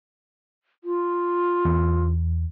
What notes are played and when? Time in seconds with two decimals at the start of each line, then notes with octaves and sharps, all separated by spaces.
0.84 F4
1.65 E2